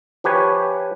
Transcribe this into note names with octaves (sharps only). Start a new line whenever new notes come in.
F3 G4 B4 C#5 G#5